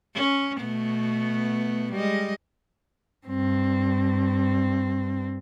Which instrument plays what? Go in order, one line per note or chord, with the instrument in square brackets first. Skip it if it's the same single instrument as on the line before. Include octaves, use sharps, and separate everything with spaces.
[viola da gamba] C#4
B2 A3 B3
G3 G#3 D#5
[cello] G2 C4